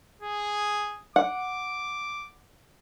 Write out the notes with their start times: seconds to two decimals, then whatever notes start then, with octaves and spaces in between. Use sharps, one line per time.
0.22 G#4
1.16 F#5 D6